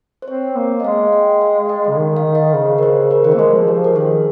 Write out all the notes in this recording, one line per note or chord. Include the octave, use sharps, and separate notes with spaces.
C5
C4 C#5
A#3
D#5
G#3 F5
G5
F5
F5
D#5
C#3 D#5
D#3
F5
D#5
C#3 C5
A#4
C5
C#3 A#4
D#3 C5
A#4
A#3
G#3 G#4
F3
F3 G4
A#4
D#3 G#4